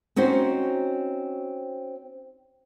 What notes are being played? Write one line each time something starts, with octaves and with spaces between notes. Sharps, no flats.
C4 C#4 D#4 F#4 C5